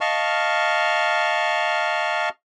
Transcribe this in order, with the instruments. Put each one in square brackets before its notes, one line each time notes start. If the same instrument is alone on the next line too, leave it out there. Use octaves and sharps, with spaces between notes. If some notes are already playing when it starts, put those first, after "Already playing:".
[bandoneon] D#5 F5 A5 C#6 F6